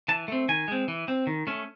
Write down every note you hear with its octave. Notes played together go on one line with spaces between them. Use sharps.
E3 A5
A3 C4
D#3 G#5
G#3 C4
E3
C4
D#3
A3 C#4